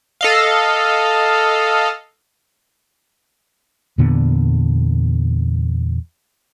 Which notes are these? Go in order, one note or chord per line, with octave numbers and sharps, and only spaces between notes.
A4 D#5 F5
E2 A#2 D3 B3